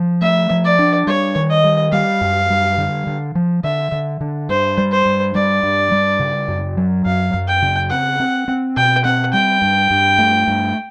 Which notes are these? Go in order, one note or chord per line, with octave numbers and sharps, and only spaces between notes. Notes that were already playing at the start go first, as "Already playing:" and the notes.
Already playing: F3
A3 E5
F3
D5
D4
G3 C#5
D#3
D#5
G3
G3 F5
F#2
G3
D3
D3
F3
D3 E5
D3
D3
G2 C5
G3
C5
G2
G3 D5
G2
G3
C#3
F#2
F#3
F#2 F5
F#2
G5
C#3
C4 F#5
C4
C4
B2 G5
C4 F#5
G3 G5
G2
G2
A3
G2